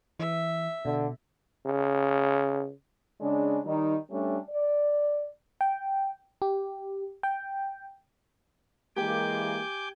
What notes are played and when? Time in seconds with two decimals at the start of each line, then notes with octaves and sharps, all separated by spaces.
0.19 E3 E5
0.85 B2 D3
1.65 C#3
3.20 C#3 G#3 D4
3.64 D#3 G3 D#4
4.10 G3 A3 C#4 D4
4.50 D5
5.61 G5
6.42 G4
7.23 G5
8.96 E3 G#3 A#3 G4 G5 G#5 D6 G6